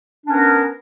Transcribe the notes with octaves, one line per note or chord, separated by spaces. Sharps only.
B3 C#4 D4 A#4